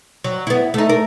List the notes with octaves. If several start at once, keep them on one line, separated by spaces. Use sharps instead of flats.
F#3
B3 E4
A3 D#4
A#4